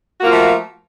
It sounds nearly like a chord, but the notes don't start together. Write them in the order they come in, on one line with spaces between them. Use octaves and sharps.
F#4 A#3 F4 F3 A3